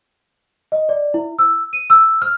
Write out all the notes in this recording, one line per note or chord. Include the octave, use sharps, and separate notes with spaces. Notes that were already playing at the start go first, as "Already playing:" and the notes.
D#5
D5
E4
E6
D#7
E6
F6